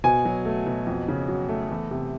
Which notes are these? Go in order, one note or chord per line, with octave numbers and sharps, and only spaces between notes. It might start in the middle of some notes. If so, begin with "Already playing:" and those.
B2 G#5
F#3
A3
B2
F2
C#3
F#3
A3
E2
C3